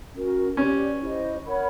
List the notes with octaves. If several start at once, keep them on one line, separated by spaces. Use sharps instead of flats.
C#4 F#4 A#4
C#4 G4 B4 D5
E4 G4 C5 D#5
A#4 C#5 F#5 B5